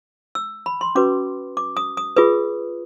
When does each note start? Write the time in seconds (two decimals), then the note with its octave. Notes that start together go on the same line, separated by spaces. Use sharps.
0.35 E6
0.66 B5
0.81 C6
0.95 C#4 F#4 B4 D6
1.57 D6
1.77 D#6
1.97 D#6
2.16 F4 G#4 B4 D#6